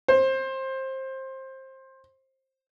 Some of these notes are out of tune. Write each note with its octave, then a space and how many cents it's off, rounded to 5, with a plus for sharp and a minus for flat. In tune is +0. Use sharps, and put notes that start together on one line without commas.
C5 +20